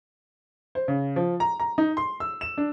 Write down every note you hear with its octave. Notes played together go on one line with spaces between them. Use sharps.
C5
C#3
F3
A#5
A#5
D#4
C6
E6
E7
D4